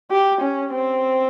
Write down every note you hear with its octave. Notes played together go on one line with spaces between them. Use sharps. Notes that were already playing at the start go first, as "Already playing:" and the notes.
G4
C#4
C4